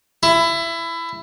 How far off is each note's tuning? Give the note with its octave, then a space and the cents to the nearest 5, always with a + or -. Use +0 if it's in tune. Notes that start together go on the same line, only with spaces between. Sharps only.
E4 +20